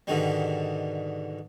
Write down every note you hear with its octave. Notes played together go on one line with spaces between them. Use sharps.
G#2 B2 D3 D#3 G3